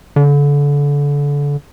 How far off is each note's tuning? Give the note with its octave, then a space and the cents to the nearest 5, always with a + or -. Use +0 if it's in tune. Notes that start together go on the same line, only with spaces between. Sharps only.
D3 -30